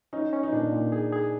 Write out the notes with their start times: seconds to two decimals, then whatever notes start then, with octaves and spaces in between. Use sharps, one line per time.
0.13 C#4 D#4
0.33 C#4
0.43 D#4
0.53 A#2 D4
0.72 A#2
0.92 G#4
1.12 G#4